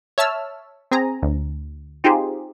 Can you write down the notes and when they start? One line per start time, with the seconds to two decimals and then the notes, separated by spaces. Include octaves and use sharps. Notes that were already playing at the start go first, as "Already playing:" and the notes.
0.18 C#5 E5 A5 E6 F6
0.91 C4 G#4 G#5 A#5
1.23 D2
2.04 C4 D#4 F4 G4 G#4 C5